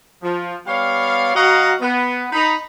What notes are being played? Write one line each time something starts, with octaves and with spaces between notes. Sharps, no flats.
F3
G3 B3 C#5 D5 F5
F#3 F#4 D#5 F5 F#5 A#5
B3
D#4 B5